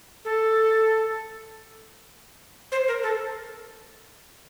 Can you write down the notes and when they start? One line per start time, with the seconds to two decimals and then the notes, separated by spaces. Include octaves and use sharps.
0.25 A4
2.72 C5
2.88 A#4
3.03 A4